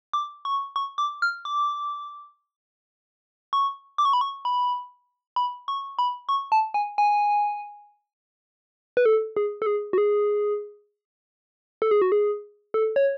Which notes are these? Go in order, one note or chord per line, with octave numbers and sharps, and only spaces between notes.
D6
C#6
C#6
D6
F6
D6
C#6
D6
C#6
B5
C#6
B5
B5
C#6
B5
C#6
A5
G#5
G#5
B4
A4
G#4
A4
G#4
F#4
G#4
A4
G#4
F#4
G#4
A4
C#5